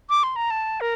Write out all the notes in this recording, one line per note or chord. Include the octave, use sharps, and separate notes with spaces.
D6
C6
A#5
A5
A#4